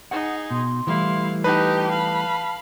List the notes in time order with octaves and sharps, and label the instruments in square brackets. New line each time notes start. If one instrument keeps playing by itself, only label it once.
[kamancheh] D#4 G#4 [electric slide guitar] F#5
[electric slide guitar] B2 [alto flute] C6
[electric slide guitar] E3 G3 A3 [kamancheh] E4 F5
[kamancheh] D#4 G4 [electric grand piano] B4 [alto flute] A5
[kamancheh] F5 B5